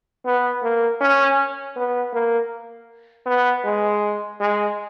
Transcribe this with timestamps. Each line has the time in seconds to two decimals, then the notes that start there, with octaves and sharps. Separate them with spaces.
0.25 B3
0.63 A#3
1.01 C#4
1.76 B3
2.13 A#3
3.26 B3
3.65 G#3
4.40 G#3